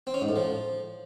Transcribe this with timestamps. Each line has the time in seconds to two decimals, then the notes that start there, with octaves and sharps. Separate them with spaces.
0.07 C4
0.14 C#4
0.21 G#2
0.29 A2
0.36 F3